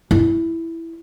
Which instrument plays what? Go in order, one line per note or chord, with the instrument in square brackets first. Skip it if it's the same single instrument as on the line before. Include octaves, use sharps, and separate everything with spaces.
[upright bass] E4